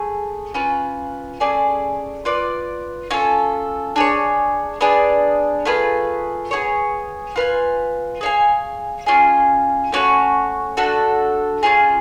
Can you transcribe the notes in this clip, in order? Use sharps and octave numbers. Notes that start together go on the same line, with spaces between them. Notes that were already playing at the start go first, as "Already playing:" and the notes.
Already playing: A3 G#4
C#4 F4 B4
A3 C#4 G#4 D5
F4 B4 D5
C#4 F4 A4
D4 G#4 C#5
B3 D4 G#4 D5
A3 F4 G#4 B4
B3 D4 G#4 C#5
F4 B4 F5 G#5
G#4 C#5 F5 G#5
C#4 F4 G#4
A3 C#4 F#4 C#5
A3 D4 F#4 A4
C#4 F4 G#4